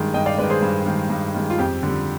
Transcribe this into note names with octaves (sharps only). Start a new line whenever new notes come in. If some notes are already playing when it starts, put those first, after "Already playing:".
Already playing: G2 D#3 G#3
G2 D#5 G5
D5 F5
D#3 G#3 B4 D5
G#4 C5
G2
D#3 G#3
G2
D#3 G#3
F4
F2 G4
D3 G3